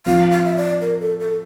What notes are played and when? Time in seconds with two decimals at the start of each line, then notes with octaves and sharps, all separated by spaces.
0.06 F3 C4 F4 F5
0.31 F5
0.45 E5
0.57 D5
0.81 A#4
1.00 A4
1.20 A4